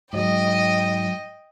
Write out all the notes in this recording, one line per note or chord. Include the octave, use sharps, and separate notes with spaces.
G#2 F#3 D#5 G5